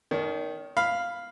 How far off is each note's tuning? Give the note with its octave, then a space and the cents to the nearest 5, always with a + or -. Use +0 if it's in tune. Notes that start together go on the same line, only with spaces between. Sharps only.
D#3 +0 C#4 +40
F5 +0 B5 +5